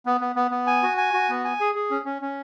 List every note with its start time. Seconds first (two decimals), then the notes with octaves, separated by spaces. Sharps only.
0.06 B3
0.21 B3
0.36 B3
0.51 B3
0.67 G#5
0.83 F#4
0.97 G#5
1.14 F#4
1.29 B3
1.44 G#5
1.60 G#4
1.75 G#4
1.91 C#4
2.05 C#4
2.22 C#4